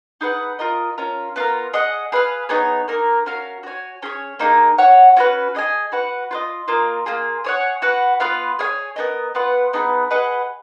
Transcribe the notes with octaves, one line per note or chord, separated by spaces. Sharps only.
D#4 G#4 B4 F#5
F4 A#4 D#5
C#4 F4 A#4
B3 F4 A#4
G#4 D#5 F#5
G#4 B4 F5
B3 D#4 G#4 C#5
A#3 D#4 A#4
C#4 F#4 A#4 F5
F#4 C#5 G#5
C#4 G#4 C#5
A#3 D#4 G#4
F#4 C#5 F#5
C#4 F#4 B4
G#4 D#5 G#5
F#4 B4 F#5
F4 B4 D#5
A#3 F4 A#4 D#5
A#3 F4 G#4
G#4 C#5 F#5
F#4 B4 F#5
B3 F4 B4 F5
G#4 C#5 F5 G#5
B3 D#4 A#4 D#5
B3 F4 B4 F#5
B3 D#4 G#4 B4
G#4 B4 D#5 F#5